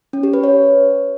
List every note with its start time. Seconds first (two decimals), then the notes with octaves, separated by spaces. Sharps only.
0.13 C#4
0.23 G4
0.33 B4
0.44 C#5